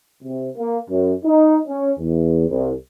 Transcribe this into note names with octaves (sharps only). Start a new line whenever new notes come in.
C3
A#3
F#2
D#4
C#4
E2
C2